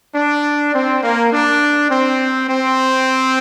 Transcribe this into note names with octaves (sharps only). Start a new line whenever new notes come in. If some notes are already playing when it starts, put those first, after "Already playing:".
D4
C4
A#3
D4
C4
C4